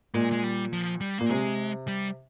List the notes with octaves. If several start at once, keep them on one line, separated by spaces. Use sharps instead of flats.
A#2 G#3
G#3
G3
F3
G3
A#2 A#3
C3 G#3
G3